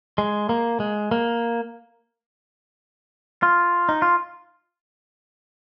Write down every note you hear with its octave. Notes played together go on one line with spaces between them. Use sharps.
G#3
A#3
G#3
A#3
F4
D#4
F4